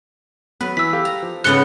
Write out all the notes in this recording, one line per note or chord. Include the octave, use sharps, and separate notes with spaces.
F#3 B3 B4
E3 E6 B6
G4 A4 F5
A#5
F3
G#2 C#3 B3 F#6 C#7 G7